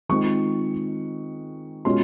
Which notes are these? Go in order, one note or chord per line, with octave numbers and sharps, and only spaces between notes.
D#3 G#3 C4 F4 C#6
B2 G#3 C#4 F4 C6